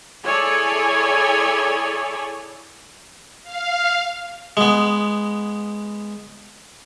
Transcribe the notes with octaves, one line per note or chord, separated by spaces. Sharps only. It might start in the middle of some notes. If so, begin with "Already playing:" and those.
E4 G#4 A4 C#5 D5 G#5
F5
G#3 B3